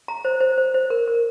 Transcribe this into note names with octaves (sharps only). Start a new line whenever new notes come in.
A#5
C5
C5
C5
C5
A#4
A#4